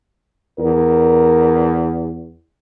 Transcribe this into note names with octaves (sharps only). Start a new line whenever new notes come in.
E2 A#4